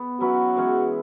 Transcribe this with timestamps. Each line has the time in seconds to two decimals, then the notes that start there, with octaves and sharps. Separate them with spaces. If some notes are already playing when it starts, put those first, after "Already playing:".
Already playing: B3
0.20 F#3 C#4 E4 F#4 B4
0.56 E3 G#3 C#4